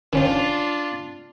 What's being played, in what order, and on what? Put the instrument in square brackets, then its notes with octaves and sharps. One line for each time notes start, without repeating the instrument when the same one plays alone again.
[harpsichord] D#3 C#4 C5 [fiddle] D4 F4